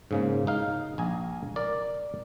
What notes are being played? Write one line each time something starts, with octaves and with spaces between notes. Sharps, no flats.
G#2 C#3 A#3
D#4 F5
A#1 G#5 A#5
A#4 D5